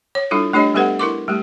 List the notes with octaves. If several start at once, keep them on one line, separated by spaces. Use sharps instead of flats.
C#5
G3 D4 E4 F4 A4
A3 D4 G4 C#5 D#5
G3 B3 G4 A4 B4 F#5
E4 A#4 C6 D6
G3 A3 G4